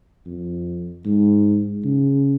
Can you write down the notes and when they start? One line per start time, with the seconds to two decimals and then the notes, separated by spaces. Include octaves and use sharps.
0.26 F2
1.05 G#2
1.85 C#3